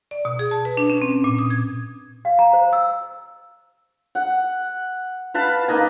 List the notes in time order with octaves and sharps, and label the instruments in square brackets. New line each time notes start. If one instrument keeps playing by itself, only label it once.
[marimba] D5
B2
G#4
A5
B4
D4
C#4
C4
A#2
D#6
G#6
[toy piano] F5
A#5
C5
E6
[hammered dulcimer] F#5
B4 F5 A5 B5
A#3 D#4 D#5 G#5